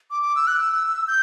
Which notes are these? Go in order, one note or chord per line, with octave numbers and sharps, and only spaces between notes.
D6
D6
E6
F#6
E6
G6